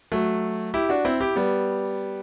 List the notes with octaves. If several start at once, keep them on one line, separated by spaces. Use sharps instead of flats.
F#3 A3
E4 G4
D4 F#4
C4 E4
E4 G4
G3 B3